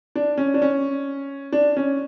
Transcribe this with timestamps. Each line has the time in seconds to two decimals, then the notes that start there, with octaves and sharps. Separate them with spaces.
0.16 D4
0.38 C#4
0.54 D4
0.62 C#4
1.52 D4
1.77 C#4